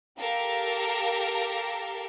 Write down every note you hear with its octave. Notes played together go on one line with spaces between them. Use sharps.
G4 A4 A#4 F5